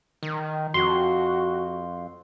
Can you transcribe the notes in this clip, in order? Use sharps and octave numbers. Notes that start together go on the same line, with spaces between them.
D#3
F2 F#4 C6